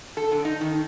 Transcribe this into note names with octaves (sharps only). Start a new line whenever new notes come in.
A4
D3
D#4
D#3